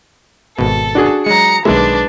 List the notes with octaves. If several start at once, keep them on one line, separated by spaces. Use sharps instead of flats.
G#1 B2 A4
D4 F#4 G#4
F#3 G#3 A#5 C#7
B1 D#3 G#3 D4 B4 E5